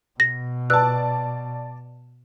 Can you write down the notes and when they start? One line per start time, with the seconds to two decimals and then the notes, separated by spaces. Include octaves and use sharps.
0.20 B2 A#6
0.70 B4 D5 A5 E6 F#6